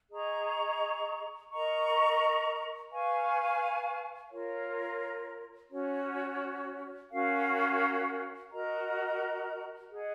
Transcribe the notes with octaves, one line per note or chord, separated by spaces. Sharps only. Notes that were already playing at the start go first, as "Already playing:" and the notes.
G#4 D#5 A#5 C#6
A#4 D#5 A#5 C#6
B4 F5 G#5 C#6
F4 A#4 C#5
C#4 F#4 C#5
C#4 F#4 A#4 F5
F#4 A#4 D#5 A#5
G#4 D#5 F#5